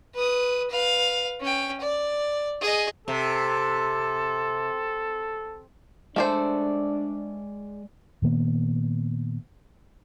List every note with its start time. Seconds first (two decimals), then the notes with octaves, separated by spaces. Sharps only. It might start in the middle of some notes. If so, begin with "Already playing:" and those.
0.14 B4 D#6
0.70 B4 F5
1.41 C#4 G5
1.80 D5
2.61 G#4 D#5
3.08 C3 A4
6.16 G#3 A3 D4 A4 C5 D5
8.22 A#2 D#3 A#3 B3